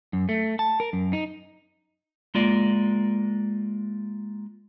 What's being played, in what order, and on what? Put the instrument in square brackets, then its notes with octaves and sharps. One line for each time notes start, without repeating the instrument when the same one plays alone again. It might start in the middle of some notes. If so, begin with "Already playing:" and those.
[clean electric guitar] F#2
A3
A5
A#4
F#2
D#4
G#3 A#3 F4 D5